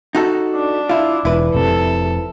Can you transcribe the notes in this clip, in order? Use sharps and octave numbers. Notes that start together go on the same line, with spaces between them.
D#4 F#4 A4
D4
E4 F4
E1 E4 B4
F1 C3 A4